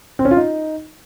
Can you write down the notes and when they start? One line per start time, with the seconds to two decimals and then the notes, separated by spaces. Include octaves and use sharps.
0.19 C4
0.25 C#4
0.31 F4
0.37 D#4